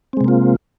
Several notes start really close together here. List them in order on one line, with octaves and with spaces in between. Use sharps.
C4 G#3 C3 A#3 F4